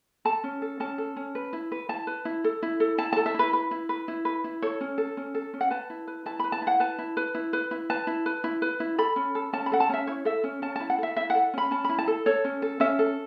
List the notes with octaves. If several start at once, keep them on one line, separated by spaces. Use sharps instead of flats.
A4 A5
C#4
A4
C#4 A5
A4
C#4
B4
E4
B4
E4 A5
B4
E4
A4
E4
A4
E4 A5
A4 A5
E5
E4 B4
B4
E4
B4
E4
B4
E4
A4 C#5
C#4
A4
C#4
A4
C#4
F#5
B4 A5
E4
B4
E4 A5
B4 B5
A5
E4
F#5
B4 A5
E4
B4
E4
B4
E4
B4 A5
E4
B4
E4
B4
E4
A4 B5
C#4
A4
C#4 A5
B5
A4 F#5
A5
C#4 E5
E4 C#5
A4 E5
C#4
C#4 A5
E4 A5
F#5
A4 E5
E4 E5
A4 F#5
C#4 B5
C#4 A5
E4 B5
A5
A4
A4 C#5
C#4
A4
C#4 E5
A4